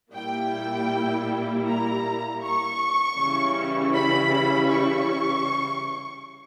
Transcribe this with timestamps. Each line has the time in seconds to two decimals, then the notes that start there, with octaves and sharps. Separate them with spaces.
0.12 A#2 G3 A#3 E4 G5
1.65 A#5
2.42 C#6
3.17 C#3 E3 G3 C#4 E4
3.93 B5
4.69 C#6